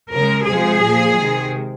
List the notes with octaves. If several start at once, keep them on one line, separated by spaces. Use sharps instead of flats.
C#3 G#3 A#4
C3 F3 G#3 G#4
A#2 F3 A#3
C3 D#3 G#3